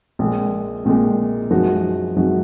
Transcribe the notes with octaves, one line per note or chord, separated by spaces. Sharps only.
A#1 A#2 G#3
A#1 A#2 G#3
F#2 F3 G#3 D#4 F#4
F#2 F3 G#3 D#4 F#4